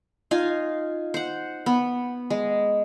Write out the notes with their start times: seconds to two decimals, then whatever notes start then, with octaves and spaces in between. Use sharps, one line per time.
0.31 D#4 F4 F5 G#5
1.14 C5 F#5
1.66 B3
2.30 G#3